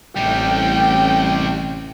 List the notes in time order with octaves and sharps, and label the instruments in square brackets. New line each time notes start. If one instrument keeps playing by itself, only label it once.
[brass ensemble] A1 [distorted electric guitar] C3 G3 [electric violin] G5